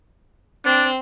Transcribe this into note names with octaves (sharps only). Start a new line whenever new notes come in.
C4 D4